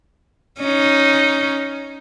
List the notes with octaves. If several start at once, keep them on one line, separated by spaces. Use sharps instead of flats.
C#4 D#4